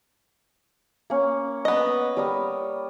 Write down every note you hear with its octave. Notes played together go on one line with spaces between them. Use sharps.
A#3 C#4
B3 D#5
G3 A#4 D#6